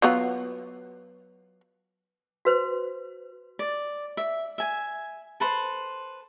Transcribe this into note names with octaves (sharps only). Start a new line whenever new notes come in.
F#3 B3 F4
F#4 B4 C5
D5
E5
E5 G#5
A4 B4 C5 C6